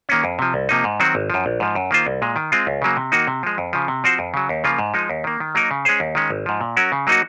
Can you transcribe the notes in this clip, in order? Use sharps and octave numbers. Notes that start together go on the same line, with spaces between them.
D#3 A#3 C#4
F2
C3 F3
C2
C3 F3 A#3 D#4
G#2
D#3 F#3 C4 F#4
G#1
F#2 F3
A#1
G#2 F3
F#2
D#3 A#3 F4 C5
C2
A#2 G#3
D#3
G#3 C4 F4
C#2
C#3 F#3 A#3
C3
D#3 A#3 D#4 F#4
C3
F3 G#3
F2
C#3 F3
C3
F3 C4 F#4 C5
F2
C#3 F#3
D#2
C#3 F3 A#3 F4
G#2
F3 G#3 D#4
D#2
D#3 A#3
D#3
F#3 A#3 D#4 A#4
C#3
G#3 C#4 G#4 C5
D#2
D#3 G#3 C#4
G#1
G#2 F3
A#2
F#3 C#4 F#4 A#4
C#3
F#3 A#3 D#4 F#4